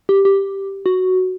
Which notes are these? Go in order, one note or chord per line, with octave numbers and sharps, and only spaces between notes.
G4
G4
F#4